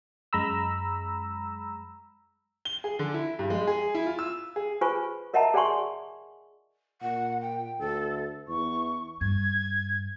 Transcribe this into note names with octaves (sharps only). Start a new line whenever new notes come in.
F#2 G#3 A#5 B5 E6
G7
G#4
D3
E4
G2
G#3
G#4
E4
F4
E6
G#4
F4 G#4 B4 C5 G#5 C#6
A#4 D#5 E5 F#5 A5 A#5
G#4 D5 F#5 G#5 C6 C#6
A#2 F#5
G5
D2 A4
E2 C#6
G2 G#6